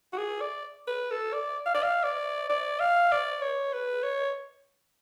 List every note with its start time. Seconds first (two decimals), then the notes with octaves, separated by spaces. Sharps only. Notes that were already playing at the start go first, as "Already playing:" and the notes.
0.13 F#4
0.18 G#4
0.41 D5
0.87 B4
1.11 A4
1.33 D5
1.66 F5
1.74 D5
1.83 F5
2.03 D5
2.49 D5
2.80 F5
3.12 D5
3.41 C#5
3.73 B4
4.03 C#5